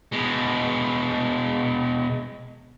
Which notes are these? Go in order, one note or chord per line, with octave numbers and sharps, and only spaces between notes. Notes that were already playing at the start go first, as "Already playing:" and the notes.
B2 G#3